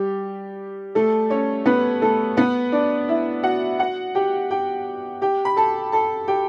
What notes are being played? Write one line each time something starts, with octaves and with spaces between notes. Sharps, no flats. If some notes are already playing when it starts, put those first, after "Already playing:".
Already playing: G3 G4
A3 A4
C#4 C#5
B3 B4
A3 A4
B3 B4
D4 D5
E4 E5
F#4 F#5
F#4 F#5
G4 G5
G4 G5
G4 G5
B5
A4 A5
A4 A5
G4 G5